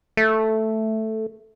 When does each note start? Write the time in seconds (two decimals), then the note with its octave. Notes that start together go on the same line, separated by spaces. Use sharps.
0.17 A3